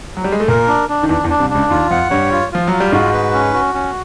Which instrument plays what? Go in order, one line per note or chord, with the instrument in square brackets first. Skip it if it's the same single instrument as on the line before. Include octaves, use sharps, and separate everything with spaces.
[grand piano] F#3
G3
G#3
A3
[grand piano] A#2 A#3 [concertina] A#4
[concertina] D4
D4
[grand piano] D#3
[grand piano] E2 E3 [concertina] D4
[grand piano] E2 E3
[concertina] D4
[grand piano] C2 C3
[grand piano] C#2 C#3 [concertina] D4
[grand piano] D#2 D#3 [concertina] F4
[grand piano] F2 F3 [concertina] F#5
[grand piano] G2 G3 [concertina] C#5
[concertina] F4
[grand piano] F3 [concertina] F4
[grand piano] F#3
[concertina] F4
[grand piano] G3
[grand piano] G#2 G#3 [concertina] F#4
[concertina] B4
C#4
F#4
C#4